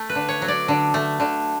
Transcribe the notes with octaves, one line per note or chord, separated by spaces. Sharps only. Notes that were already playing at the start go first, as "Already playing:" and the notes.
Already playing: A3
B4
D3
C#5
F#3
D5
D3
A3
D3